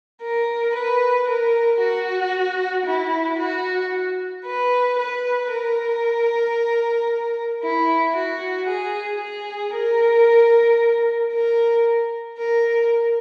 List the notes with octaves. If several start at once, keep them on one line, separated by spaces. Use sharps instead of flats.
A#4
B4
A#4
F#4
E4
F#4
B4
B4
A#4
E4
F#4
G#4
G#4
A#4
A#4
A#4